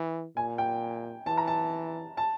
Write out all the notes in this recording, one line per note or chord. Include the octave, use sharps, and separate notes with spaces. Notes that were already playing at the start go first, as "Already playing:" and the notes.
Already playing: E3
A#2 G#5
G5
E3 A5
A#5
A5
A5